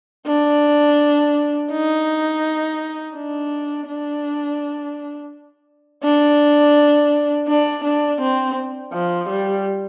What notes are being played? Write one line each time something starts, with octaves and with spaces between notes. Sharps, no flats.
D4
D#4
D4
D4
D4
D4
D4
C4
F3
G3